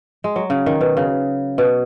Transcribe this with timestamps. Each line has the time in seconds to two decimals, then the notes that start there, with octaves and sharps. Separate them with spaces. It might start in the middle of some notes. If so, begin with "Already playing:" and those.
0.24 G#3
0.36 F#3
0.50 C#3
0.66 D#3
0.81 B2
0.97 C#3
1.58 B2